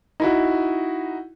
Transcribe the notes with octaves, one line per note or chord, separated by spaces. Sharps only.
D#4 E4 F#4